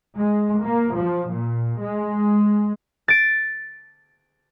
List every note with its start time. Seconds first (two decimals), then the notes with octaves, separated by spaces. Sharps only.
0.17 G#3
0.64 A#3
0.96 F3
1.32 A#2
1.81 G#3
3.08 A6 D7